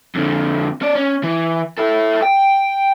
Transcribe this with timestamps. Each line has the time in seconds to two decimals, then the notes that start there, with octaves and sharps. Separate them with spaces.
0.15 F2 D3
0.82 C#4 D5
0.95 C#4
1.23 E3
1.78 E4 A4
2.22 G5